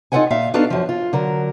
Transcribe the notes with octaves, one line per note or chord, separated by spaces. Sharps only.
D#4 F4 A4 B4 F#5 G#5
A#2 E5 F5
B3 D4 D#4 F#4 A4 F5
F#2 F3
F4
D3 F#3 A#4